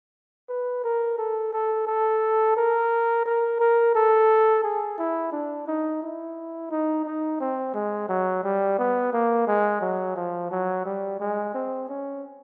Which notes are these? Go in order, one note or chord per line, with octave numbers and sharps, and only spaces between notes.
B4
A#4
A4
A4
A4
A#4
A#4
A#4
A4
G#4
E4
D4
D#4
E4
D#4
D#4
C4
G#3
F#3
G3
B3
A#3
G#3
F#3
F3
F#3
G3
G#3
C4
C#4